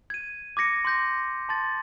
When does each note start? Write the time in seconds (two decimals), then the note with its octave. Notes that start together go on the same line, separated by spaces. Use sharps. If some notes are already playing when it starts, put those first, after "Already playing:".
0.10 G#6 D#7
0.57 D6 G#6 A#6 C#7
0.85 C6 D6 G6 A#6
1.49 A5 C6 A6